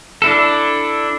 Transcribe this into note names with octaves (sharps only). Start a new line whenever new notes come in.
D4 E4 A4